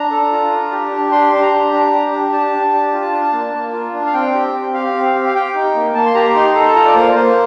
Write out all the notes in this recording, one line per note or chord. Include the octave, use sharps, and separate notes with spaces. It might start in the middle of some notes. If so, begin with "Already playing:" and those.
Already playing: D4 A#5
A4
F4
D4
G4
D4
G4 C6
D4 C6
A#5
G4
D4
G4
D4
G4 A5
D4
G4
F4
D4
A#3
A#3
F4
D4
F5
C4 G5
G4
C4
G4 F5
C4
G4
F5
G4 G5
D#4
A#3
A#3 A5
C6
G4 A#5
D#4 C6
A4 A#5
A5
F4 A#5
D5
A#3 C5
A#3 C5